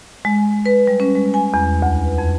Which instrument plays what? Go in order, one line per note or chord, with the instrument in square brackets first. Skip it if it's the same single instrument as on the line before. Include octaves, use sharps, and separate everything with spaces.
[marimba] G#3
B4
G3
C#4
G#3
G#5
E2
D2
B4
F2